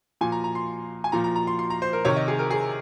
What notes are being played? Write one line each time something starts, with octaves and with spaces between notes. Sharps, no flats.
A#2 F3 G#5
A#5
A#5
C6
G#5
A#2 F3 A#5
A#5
A#5
C6
C6
A#5
C5
A#4
C3 D#3 C#5
D#5
G#4
A#4
G#4